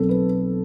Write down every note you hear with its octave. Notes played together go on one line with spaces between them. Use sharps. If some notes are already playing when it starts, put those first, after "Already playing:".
Already playing: B1 B2 C4 A4
B4